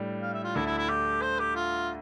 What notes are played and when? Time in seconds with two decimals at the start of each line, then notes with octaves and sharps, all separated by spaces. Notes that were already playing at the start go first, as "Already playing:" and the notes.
Already playing: A2 G3 D4
0.22 F5
0.34 E5
0.44 F4
0.55 D2 D3 A3 D4 E4 A4
0.66 E4
0.78 E4
0.89 G4
1.22 C5
1.39 G4
1.56 F4